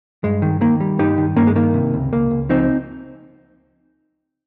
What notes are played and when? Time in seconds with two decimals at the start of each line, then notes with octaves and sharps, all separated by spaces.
0.24 G2 G#3
0.42 D#3
0.61 D#3 A#3
0.80 G3
0.99 G2 D#4 G4
1.18 D#3
1.36 G2 A#3 C#4
1.47 G#3
1.56 D#3 A#3
1.74 C3
1.94 C#2
2.13 C#2 A#3
2.31 C#2
2.49 F3 C4 D#4